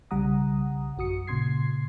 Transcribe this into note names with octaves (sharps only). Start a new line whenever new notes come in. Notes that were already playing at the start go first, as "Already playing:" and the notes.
B1 C#3 G3 F#5 A#5 D#6
A1 F#2 F#4 D#6 C#7
A#2 C#3 C6 G#6 C7